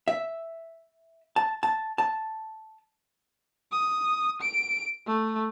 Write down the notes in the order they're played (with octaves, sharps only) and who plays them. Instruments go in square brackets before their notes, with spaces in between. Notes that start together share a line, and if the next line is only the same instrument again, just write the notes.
[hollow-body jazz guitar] E5
A5
A5
A5
[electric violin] D#6
D7
A3